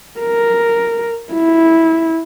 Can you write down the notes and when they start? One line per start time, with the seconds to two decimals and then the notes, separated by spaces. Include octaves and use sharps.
0.20 A#4
1.33 E4